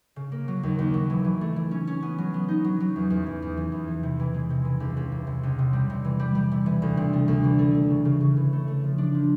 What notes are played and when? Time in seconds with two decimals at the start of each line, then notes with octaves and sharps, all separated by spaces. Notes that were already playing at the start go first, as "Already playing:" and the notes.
0.16 C#3
0.32 A#3
0.48 F#3
0.63 D#2
0.79 D#2
0.94 F#3
1.10 E3
1.24 E3
1.41 A3
1.56 E3
1.71 C#4
1.87 C#4
2.03 B3
2.18 F#3
2.34 B3
2.48 D#4
2.64 F#3
2.80 F#3
2.96 E2
3.10 E2
3.26 E2
3.42 E2
3.57 E3
3.72 E2
3.88 E3
4.03 C3
4.20 E3
4.34 G#3
4.50 C3
4.65 E3
4.80 C#2
4.97 C#2
5.12 E3
5.27 C3
5.43 C#2
5.59 C3
5.73 G3
5.90 C3
6.04 E3
6.19 G3
6.35 G3
6.52 C3
6.66 E3
6.82 D2
6.97 C3
7.13 A3
7.28 D2
7.44 E3
7.59 A3
7.75 A3
7.90 C#3
8.05 C#3
8.21 C#3
8.36 E3
8.53 A3
8.67 A3
8.83 F3
8.98 D4
9.14 F3